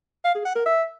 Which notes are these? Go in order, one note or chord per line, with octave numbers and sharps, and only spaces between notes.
F5
G#4
F#5
A#4
E5